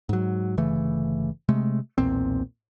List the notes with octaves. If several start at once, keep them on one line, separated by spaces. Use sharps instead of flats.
G#2 F#3
G1 C#3 E3 A3
C3 G#3 A3
B1 E2 A#2 C4